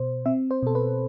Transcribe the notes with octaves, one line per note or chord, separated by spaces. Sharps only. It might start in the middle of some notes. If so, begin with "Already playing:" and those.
Already playing: B2 C5
C4 E5
C5
B2 A4
B4